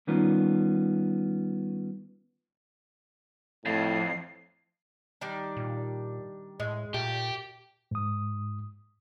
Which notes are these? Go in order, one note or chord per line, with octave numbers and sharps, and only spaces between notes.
D#3 G3 B3 C#4 D#4 F4
F2 A2 C7
D#3 G3 D4
A#2
A2 G#3
A#2 A3 G4
G#2 D#6